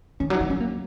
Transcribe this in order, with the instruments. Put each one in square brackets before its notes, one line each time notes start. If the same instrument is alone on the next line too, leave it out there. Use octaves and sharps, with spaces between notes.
[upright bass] D#3 [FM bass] C#4
[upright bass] F#3
[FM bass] D#4
[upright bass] D#3
[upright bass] F#3 [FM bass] C#4
[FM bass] A#3